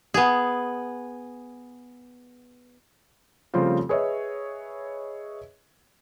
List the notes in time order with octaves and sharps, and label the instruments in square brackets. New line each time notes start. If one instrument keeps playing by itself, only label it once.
[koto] B3 G#4
[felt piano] C#3 F3 G3 A3 C4 F4
G#4 B4 C#5 D#5 E5